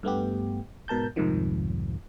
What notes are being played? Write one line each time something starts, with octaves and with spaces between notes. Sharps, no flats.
G2 A3 B3 G4
G#2 B2 A#4 A5 G6
C2 F2 G#2 C3 D#3 F3